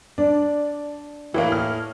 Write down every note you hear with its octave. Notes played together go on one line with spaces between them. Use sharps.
D4 D5
A2 E3 A#3
F6